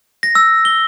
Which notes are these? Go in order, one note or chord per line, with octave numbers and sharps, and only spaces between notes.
A#6
E6
G7